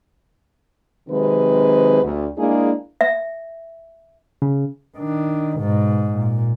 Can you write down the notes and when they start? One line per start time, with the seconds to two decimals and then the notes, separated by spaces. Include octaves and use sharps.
1.09 C3 D#3 F#3 G#3 C4 B4
2.03 D2
2.37 G#3 A#3 D4 E4 G#4
3.01 E5
4.42 C#3
4.97 D#3 D4
5.58 G#2 B2
6.12 A#2